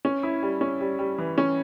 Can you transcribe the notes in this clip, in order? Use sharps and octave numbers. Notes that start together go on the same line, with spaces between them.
C#4
E4
G3
C#4
G3
G3
E3
C#4